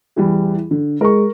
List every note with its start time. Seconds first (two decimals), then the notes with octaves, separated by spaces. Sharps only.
0.16 E2 E3 G3
0.71 D3
1.01 G#3 A#4 C#6